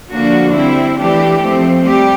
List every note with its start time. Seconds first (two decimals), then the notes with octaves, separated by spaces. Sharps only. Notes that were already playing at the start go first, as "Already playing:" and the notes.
0.11 D3 F3 A#3 D4 F#4
0.55 G3 C4 E4
0.99 E3 A3 D4 G4
1.43 F3 A3 C4
1.87 G3 G4